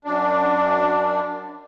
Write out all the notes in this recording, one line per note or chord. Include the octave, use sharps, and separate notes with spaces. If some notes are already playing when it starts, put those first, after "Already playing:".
F#2 D4